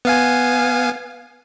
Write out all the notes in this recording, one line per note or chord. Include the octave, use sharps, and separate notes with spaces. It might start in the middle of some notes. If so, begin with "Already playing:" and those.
B3 F5 G#5